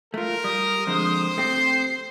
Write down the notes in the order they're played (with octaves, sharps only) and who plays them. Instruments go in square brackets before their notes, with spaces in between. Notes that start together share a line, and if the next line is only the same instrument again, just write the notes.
[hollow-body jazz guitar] A3 F4 [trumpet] A#4
[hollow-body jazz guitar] G3 [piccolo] D#6
[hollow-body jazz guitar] F2 D3 G#3 [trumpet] C5
[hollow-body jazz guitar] A3 C4 G4 [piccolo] C7